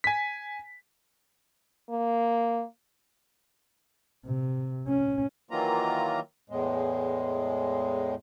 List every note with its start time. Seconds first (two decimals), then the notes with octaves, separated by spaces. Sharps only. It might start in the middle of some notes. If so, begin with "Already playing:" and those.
0.04 G#5 B6
1.90 A#3
4.26 C3
4.87 C#4
5.51 D#3 E3 F#3 A#3 F4 A#5
6.50 E2 A2 G#3